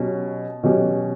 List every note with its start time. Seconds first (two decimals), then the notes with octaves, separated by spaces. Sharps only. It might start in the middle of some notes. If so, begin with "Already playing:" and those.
Already playing: B2 F#3 C#4 G4
0.63 B2 F#3 C#4 G4